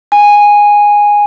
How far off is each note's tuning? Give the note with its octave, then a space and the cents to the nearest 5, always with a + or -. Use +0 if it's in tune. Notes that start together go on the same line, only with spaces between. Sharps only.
G#5 -10